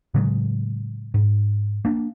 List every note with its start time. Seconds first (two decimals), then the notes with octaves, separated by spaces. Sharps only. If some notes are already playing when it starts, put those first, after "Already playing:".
0.14 A2 C#3 F#3 G#3
1.14 G#2
1.85 A#3 D4